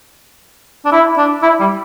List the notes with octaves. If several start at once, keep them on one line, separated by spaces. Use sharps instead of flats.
D4
E4
D4
E4
G3